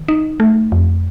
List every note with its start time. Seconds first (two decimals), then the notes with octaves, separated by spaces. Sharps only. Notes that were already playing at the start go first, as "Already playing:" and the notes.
Already playing: D#3
0.08 D#4
0.40 A3
0.72 F2